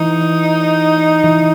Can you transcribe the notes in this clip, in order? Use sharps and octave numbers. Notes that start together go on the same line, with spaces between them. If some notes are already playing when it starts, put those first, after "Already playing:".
Already playing: E3 D#4
E3